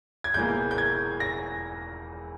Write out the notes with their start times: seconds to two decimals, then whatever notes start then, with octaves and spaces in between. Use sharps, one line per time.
0.24 G#6
0.34 E1 E2 E3 A#3 G6
0.71 G6
0.78 G#6
1.20 A#6